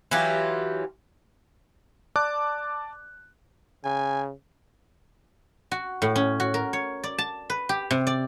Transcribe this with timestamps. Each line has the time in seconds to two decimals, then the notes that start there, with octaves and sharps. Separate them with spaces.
0.11 E3 F#3 F4 G4
2.16 D5 A5 D6 F#6
3.84 C#3 G#5
5.71 F#4
6.02 A2
6.16 C#4
6.40 F#4
6.54 A#4
6.73 C#5
7.04 D5
7.18 A5
7.50 B4
7.69 G4
7.91 C3
8.07 D5